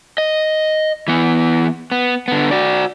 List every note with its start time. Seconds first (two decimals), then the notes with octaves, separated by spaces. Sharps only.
0.18 D#5
1.08 E3 B3
1.92 B3
2.28 D3 B3
2.51 F#4 D5